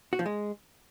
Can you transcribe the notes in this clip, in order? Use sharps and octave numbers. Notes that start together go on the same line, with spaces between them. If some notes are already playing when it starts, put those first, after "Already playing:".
F#4
F3
G#3